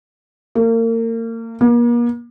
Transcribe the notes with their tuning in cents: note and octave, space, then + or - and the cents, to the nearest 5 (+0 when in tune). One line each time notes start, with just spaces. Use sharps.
A#3 -35
A#3 +40